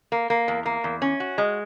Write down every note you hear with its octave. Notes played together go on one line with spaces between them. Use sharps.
A#3
A#3
E2
A#3
E2
C#4
F#4
G#3